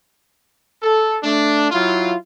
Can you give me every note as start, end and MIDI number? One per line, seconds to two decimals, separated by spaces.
0.82 1.16 69
1.23 1.68 57
1.23 1.68 62
1.71 2.14 54
1.71 2.14 64
1.71 2.14 65